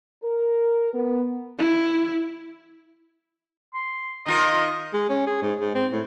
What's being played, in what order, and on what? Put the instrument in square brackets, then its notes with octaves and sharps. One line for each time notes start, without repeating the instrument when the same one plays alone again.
[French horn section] A#4
B3
[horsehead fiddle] E4
[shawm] C6
[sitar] D#3 F4 A#4 [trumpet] D#5 [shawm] A#5
[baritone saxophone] G#3
C#4
G#4
G#2
G#2
C4
A2